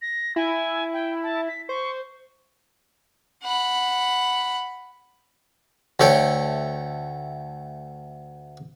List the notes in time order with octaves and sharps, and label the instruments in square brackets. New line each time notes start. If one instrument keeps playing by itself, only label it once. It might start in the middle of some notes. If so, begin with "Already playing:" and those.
[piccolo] A#6
[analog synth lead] E4 [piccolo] G#5
[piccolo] G5
A5
B6
[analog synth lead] C5 [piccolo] C#6
[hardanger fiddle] F#5 B5
[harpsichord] D2 A3 C#5 G5